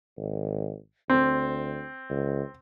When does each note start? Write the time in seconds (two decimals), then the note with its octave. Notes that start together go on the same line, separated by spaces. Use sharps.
0.17 G#1
1.10 D2 C4
2.10 C#2